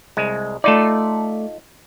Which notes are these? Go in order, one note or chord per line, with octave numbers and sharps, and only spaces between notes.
C2 G#3
A3 D#4 F4 A4 D5